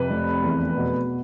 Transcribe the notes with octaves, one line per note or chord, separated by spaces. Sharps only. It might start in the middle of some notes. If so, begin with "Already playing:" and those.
Already playing: F2 C3 B4
F1
E2
B2